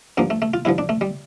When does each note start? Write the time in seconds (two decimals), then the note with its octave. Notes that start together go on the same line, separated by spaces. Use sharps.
0.17 G2 D3 F3 A#3
0.30 A3
0.42 A3
0.54 F4
0.65 G2 D3 F3 E4
0.78 D4
0.89 A3
1.01 G3